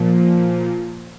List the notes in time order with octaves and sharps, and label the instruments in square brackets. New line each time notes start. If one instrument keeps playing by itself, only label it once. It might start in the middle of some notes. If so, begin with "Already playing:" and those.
Already playing: [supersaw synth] A#2 F3